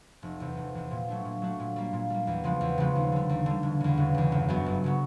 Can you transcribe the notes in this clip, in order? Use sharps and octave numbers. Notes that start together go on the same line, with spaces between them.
F1
E2 C3
F1
E2 C3
A#2
F#3 A3 D4
A#2
F#3 A3 D4
A#2
G3 A#3
A#2
G3 A#3
E2
C#3 F3 G#3 B3
E2
C#3 F3 G#3 B3
D#2
D3 G3
D#2
D3 G3
E1
E2 C#3
E1
E2 C#3
G1
F#2 C#3 F#3 B3
G1
C#3 F#3 B3